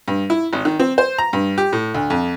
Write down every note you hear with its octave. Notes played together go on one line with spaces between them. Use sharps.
G2
E4
G#1
D#3
C4
C5
A#5
G2
G4
A2
D2
F2